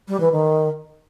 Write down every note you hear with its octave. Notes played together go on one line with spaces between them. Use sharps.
G3
E3
D#3